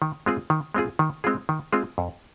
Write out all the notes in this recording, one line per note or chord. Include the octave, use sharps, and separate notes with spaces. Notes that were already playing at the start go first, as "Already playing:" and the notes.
D#3
G#3 C4 F4 G#4
D#3
G#3 C4 F4 G#4
D#3
G#3 C4 F4 G#4
D#3
G#3 C4 F4 G#4
F2